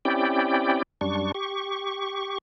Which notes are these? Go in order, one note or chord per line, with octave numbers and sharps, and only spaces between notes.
C4 C#4 E4 G4 D5 G5
F#2 G3 D4 C#6
G4 C#6